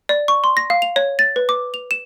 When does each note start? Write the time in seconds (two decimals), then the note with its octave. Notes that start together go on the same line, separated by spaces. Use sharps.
0.09 D5
0.28 C#6
0.44 C6
0.57 A#6
0.70 F5
0.82 F7
0.96 C#5
1.19 A6
1.36 B4
1.49 D6
1.74 F7
1.91 E7